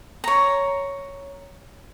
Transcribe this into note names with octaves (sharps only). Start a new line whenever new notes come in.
C#5 A#5